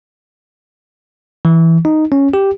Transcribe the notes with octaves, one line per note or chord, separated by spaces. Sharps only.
E3
D#4
C#4
G4